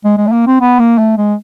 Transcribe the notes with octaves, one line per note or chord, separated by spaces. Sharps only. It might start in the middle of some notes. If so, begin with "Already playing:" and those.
G#3
G#3
A3
A#3
C4
B3
A#3
A3
G#3